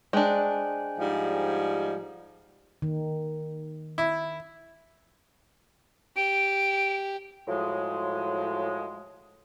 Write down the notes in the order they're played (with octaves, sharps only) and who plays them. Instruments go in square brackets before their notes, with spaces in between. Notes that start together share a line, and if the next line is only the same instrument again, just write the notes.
[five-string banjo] G#3 D4 [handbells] C5 G5 G#5
[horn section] G#2 F3 G3
[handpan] D#3
[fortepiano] E4
[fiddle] G4 [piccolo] D7
[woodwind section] A2 F3 F#3 G#3